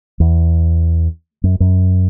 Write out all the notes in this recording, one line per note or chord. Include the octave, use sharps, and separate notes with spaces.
E2
F#2
F#2